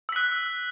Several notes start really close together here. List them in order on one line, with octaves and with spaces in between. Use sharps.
E6 B6 F#6